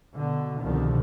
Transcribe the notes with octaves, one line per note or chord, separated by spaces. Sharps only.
B2 D3
C2 B2 D3 D#3 F3